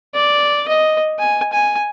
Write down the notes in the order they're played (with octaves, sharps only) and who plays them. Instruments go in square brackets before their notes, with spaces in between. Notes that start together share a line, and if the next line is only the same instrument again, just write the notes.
[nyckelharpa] D5
D#5
G#5
G#5